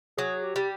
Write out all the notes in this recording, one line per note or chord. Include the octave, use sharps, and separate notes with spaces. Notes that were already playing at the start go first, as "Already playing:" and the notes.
F#3 G#4
G4
G3